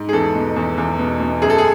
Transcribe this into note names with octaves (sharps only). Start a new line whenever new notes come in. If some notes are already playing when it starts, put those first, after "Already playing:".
Already playing: G#2
G#4
E2 A4
B2
E2
E2
B2
B2
F#2 G#4
A4
G#4